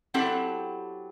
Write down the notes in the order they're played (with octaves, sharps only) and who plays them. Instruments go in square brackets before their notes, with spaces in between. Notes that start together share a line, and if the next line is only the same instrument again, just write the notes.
[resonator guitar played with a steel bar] F#3 C4 E4 G4 A4 F#5